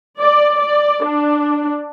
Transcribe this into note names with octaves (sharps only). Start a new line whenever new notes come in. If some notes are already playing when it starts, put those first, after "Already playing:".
D5
D5
D4